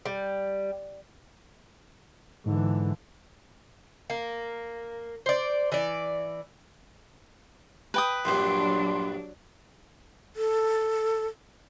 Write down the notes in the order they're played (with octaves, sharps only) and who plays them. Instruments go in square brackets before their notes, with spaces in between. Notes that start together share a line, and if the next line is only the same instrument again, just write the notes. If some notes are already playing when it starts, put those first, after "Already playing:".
[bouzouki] G3
[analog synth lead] G#2 [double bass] D3 E3
[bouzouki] A#3
C5 D5
E3 D5
[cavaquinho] B4 G5 D#6
[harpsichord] A#1 G2 [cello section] F#3 D4 [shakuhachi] C6
[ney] A4